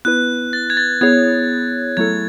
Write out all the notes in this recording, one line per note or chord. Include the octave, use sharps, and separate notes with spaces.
B3 E4 B4 F#6
A6
G#6
A6
B3 E4 G#4 C#5 G#6
F#3 A3 E4 A4 G#6